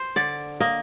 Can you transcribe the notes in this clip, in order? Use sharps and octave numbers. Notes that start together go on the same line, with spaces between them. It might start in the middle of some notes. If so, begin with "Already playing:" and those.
Already playing: C5
D3 D5
A#3 D#5